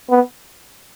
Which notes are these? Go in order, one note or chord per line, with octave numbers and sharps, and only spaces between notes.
B3